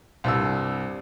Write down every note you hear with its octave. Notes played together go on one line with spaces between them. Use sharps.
C2 G2 E6